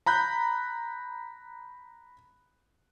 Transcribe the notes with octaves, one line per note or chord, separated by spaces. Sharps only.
A#5 B5 F#6 G6